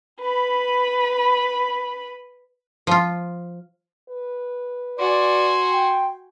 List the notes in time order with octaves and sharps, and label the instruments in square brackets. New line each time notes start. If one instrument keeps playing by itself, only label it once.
[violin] B4 B5
[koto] F3 F4
[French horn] B4
[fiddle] F#4 G#5 [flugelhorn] D5 [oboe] C6
[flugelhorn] G5